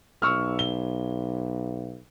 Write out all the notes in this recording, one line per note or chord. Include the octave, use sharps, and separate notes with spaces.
B1 C#6 E6 F6
G7